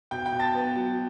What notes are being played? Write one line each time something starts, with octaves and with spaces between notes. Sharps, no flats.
B2 G5 G6
G5 G6
B2
A5 A6
B3
F#3